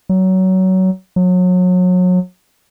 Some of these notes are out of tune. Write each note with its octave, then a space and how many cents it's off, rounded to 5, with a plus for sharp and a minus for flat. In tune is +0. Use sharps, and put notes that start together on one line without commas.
F#3 +20
F#3 -30